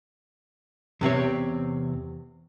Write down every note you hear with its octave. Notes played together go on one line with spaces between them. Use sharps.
E2 C3 C4 C#5